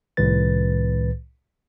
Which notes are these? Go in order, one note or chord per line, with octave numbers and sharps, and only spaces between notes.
C2 A2 D#3 B4 A6